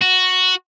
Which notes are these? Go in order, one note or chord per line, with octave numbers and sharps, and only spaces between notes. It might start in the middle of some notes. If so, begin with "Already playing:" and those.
F#4